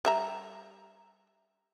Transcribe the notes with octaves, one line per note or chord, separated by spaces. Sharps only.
G3 E5 A#5